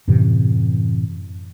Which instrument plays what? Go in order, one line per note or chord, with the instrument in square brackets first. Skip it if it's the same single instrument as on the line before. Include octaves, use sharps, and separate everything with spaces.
[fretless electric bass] F#2 A2 C3 E3